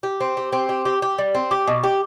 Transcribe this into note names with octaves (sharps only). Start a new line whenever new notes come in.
G4
C4
G4
C4
G4
G4
G4
G3
C4
G4
B2
G4